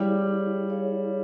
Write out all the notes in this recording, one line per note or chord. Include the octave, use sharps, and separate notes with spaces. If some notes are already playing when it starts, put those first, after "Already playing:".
Already playing: G3 E4 G#4 C#5 F5
E4 G#4 C#5 F5